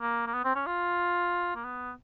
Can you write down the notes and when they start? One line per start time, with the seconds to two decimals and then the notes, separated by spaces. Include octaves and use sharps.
0.01 A#3
0.27 A#3
0.33 B3
0.44 C4
0.55 C#4
0.66 F4
1.56 A#3
1.64 B3